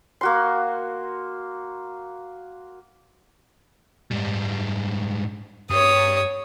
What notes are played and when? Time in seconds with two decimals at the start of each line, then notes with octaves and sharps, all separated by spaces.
0.21 A#3 F#4 C6
4.12 G#2 G3
5.71 G2 C#5 D#6